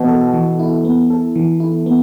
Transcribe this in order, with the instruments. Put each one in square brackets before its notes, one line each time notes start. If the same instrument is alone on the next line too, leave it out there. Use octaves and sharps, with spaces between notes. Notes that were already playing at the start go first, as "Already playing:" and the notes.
Already playing: [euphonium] B2 [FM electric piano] E3 B3
[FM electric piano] A4
E3
E4
B3
A4
E3
E4
B3